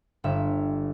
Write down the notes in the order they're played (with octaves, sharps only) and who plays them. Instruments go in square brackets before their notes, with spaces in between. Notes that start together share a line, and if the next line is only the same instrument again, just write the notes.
[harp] G1 E5